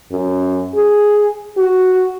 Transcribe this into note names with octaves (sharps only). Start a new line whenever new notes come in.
F#2
G#4
F#4